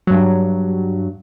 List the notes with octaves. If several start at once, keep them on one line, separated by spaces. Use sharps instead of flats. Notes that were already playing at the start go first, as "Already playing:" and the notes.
G2 F#3